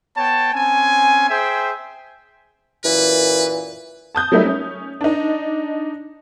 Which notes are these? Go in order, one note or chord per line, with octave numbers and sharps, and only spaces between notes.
B3 C#5 G5 A5
C4 C#4 G#5
G#4 C5 E5 G5 G#5
F#2 A#2 E3 B4
A5 D#6 G6
F#3 G3 A3 A#3 D#4 E5
C#4
D4 D#4